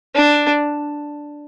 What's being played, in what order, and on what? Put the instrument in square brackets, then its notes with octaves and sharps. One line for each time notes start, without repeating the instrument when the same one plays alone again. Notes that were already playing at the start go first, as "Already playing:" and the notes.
[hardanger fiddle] D4